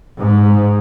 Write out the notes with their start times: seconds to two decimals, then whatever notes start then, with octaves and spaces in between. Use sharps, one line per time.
0.19 G#2